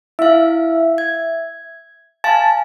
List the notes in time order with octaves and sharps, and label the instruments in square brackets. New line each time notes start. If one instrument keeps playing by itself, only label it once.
[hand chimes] E4 F5 [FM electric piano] E5
[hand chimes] G#6
[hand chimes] F5 G#5 [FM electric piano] A5